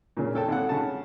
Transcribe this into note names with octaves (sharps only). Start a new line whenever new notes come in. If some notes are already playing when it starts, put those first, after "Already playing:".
A#2 C#3
C#4 A4 G5 A5
G#1 F#5
C#3 A5